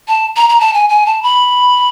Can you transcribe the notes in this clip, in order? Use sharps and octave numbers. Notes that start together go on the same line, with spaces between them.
A5
A#5
A#5
A5
G#5
G#5
A5
B5